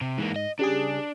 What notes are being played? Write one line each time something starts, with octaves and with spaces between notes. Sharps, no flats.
C3
G#2 E3 A#3
D#5
C#3 G3 D4 G#4